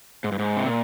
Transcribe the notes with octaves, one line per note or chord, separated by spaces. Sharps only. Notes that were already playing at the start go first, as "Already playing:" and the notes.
G#2
G2
G#2
C3
A#2